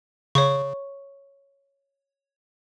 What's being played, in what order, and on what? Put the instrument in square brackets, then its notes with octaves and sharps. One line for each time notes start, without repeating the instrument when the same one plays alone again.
[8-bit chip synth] C#3 [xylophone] C#5 C#6